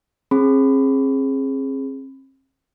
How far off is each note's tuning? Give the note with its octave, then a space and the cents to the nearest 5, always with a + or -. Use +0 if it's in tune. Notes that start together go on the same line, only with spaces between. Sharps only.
C4 +45 G#4 +0 B5 +20